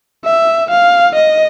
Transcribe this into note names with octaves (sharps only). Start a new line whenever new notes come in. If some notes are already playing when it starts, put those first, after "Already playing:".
E5
F5
D#5